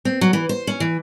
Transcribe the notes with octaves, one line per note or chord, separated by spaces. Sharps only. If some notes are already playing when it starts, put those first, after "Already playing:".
C4
F#3
E3
C5
C#4
E3